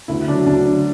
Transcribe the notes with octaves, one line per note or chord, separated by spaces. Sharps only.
D2 E4
D3 F#3 D4
D2 D4
D3 F#3